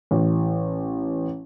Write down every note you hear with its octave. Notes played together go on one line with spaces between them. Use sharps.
A1